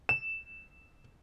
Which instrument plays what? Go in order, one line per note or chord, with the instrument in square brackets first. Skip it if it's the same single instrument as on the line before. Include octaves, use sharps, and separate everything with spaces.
[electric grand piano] E7